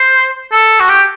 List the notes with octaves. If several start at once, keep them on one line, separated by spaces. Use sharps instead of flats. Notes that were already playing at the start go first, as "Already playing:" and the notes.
Already playing: C5
A4
F#4
G4